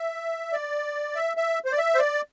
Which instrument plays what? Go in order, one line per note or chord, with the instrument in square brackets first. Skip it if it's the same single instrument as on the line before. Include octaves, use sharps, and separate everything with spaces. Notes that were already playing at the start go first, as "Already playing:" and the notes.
Already playing: [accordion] E5
D5
E5
E5
C5
D5
E5
C5
D5